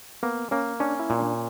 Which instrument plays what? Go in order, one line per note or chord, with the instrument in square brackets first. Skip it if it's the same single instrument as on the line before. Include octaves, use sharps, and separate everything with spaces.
[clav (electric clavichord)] A#3 [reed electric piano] B3
[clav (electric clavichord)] A#3 [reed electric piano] C#4
[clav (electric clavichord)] C#4 [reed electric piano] D4
[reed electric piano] E4
[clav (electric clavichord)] A#2
[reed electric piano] D4